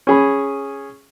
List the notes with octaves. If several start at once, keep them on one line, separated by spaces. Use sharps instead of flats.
C#4 G#4 B5